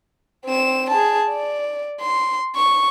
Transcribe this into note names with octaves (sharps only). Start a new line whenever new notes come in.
C4 E7
G#4 A5
D5
C6
C#6